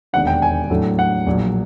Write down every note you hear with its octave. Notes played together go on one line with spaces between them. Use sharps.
E1 D#2 D3 F#5
G5
G#5
A2 F#3 A3 D4
F#5
A#1 A#2 F#3